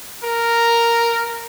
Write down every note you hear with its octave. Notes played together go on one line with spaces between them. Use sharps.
A#4